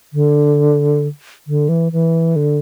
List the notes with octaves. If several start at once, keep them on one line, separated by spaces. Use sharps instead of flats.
D3
D3
E3
E3
D3